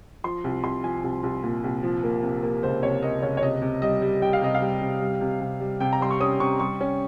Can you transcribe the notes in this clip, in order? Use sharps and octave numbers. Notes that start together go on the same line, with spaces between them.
F3 C6
C2
C2 C6
F3 G#5
C2
C2
A#2
C2
F3
A#3
C3
A#3
C#2 C5
C3 C#5
A#3 D#5
C#2 C#5
C#5
C3 D#5
C3
G3 D#5
G3
G3 G5
F5
C3 D#5
F5
G3
C3
G3
C3
C3
G3
C3 G5
A#5
G3 C6
C#6
C#4 D#6
C3 C#6
G3 C#6
C#4